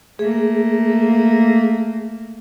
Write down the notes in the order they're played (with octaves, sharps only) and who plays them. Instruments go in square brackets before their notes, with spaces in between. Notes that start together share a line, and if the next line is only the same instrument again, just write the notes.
[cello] A3 A#3 [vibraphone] G#4